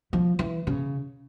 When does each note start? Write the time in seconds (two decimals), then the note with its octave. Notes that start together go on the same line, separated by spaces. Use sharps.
0.13 F3
0.39 E3
0.67 C#3